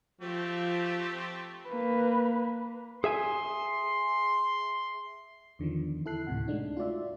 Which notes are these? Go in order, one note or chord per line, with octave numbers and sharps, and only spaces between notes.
F3 A3 C4 G4
A#3 B4
G#4 E5 G#5 C6
E2 D3 D#3 F3
E4 A4 F#6 C7
D2 A2 C3 F#5
G#3 A3 D4 D#4
F4 F#4 D5 E5